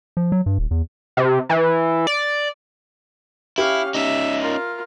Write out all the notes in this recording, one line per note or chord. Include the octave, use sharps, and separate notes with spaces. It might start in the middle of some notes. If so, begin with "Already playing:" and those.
F3
F#3
G2
D#1
E2
C3
E3
D5
C#4 E4 G4 F5
C#4 D#4 E5
F4 A#4